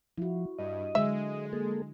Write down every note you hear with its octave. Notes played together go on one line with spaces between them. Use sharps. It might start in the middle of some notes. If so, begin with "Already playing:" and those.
F3 E4 F#4
G2 D#5
D3 F#3 G#3 E5
A#3 G#4 A4